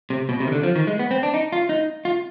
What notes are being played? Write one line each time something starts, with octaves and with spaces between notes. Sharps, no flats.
C3
B2
C3
D#3
D3
F3
D#3
G#3
B3
C4
D4
D#4
F4
D#4
F4